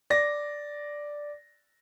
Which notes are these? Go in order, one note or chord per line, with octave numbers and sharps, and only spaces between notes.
D5 A#6